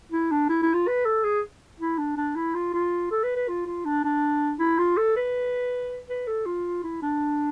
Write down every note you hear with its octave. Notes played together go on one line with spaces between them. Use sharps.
E4
D4
E4
E4
F4
B4
A4
G#4
E4
D4
D4
E4
F4
F4
A4
B4
B4
F4
F4
D4
D4
E4
F4
A4
B4
B4
A4
F4
E4
D4